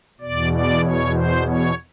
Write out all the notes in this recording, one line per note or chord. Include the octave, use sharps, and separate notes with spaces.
E2 B2 D5
D5
C#5
C5
C#5